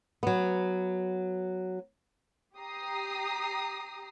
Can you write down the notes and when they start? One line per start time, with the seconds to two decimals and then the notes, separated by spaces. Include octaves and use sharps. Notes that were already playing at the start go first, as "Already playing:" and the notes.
0.23 F#3 B3
2.58 G4 A#5 D#6 C7